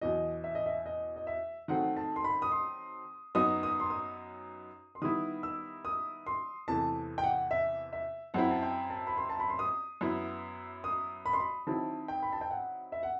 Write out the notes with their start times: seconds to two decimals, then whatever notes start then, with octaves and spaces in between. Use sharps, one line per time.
0.01 E2 B2 F#3 D#5
0.44 E5
0.55 D#5
0.66 E5
0.86 D#5
1.16 D#5
1.27 E5
1.68 D#3 F#3 A3 C4 F#5
1.97 A5
2.16 C6
2.24 B5
2.42 D#6
2.52 C6
3.35 F#2 F#3 B3 D#4 D#6
3.63 D#6
3.80 C6
3.90 D#6
4.95 C6
5.02 D#3 G3 B3 E4 D#6
5.43 E6
5.85 D#6
6.27 C6
6.68 E2 C3 E3 A3 A5
7.18 G5
7.23 F#5
7.51 E5
7.93 E5
8.34 F#2 F#3 C4 E4 F#5
8.51 A5
8.63 G5
8.90 A5
9.07 B5
9.17 C6
9.30 A5
9.40 B5
9.50 C6
9.59 D#6
10.01 F#2 F#3 B3 E4
10.84 D#6
11.26 B5
11.33 C6
11.40 B5
11.67 D#3 F#3 C4 E4 A5
12.08 G5
12.23 B5
12.33 A5
12.41 G5
12.51 F#5
12.92 E5
13.03 F#5